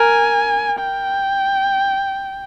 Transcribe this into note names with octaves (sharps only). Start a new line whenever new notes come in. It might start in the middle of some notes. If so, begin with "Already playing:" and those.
Already playing: A#4 G#5
G5